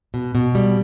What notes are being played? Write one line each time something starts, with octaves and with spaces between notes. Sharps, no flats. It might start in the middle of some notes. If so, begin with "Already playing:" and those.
B2
B2
G3